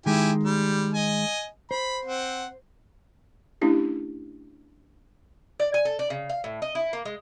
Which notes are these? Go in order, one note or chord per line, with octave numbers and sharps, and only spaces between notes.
D#3 G#3 E4 G4 G#5
G3
D#5 G#5
C5 B5
C4 F#5
A3 C#4 D4 E4 G4
D5
G#5
A4
D5
C#3
F5
A2
D#5
E4
A#3
G#3